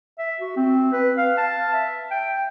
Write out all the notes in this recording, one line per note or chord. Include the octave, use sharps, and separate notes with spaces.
E5
F#4
C4
B4
F5
A5
E5
G5